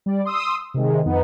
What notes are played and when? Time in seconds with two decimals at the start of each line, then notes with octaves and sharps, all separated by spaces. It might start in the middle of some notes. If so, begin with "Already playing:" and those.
0.06 G3 D5
0.25 C6 D#6 E6
0.74 C3 D#3 G#3
1.06 F2 B3 D#4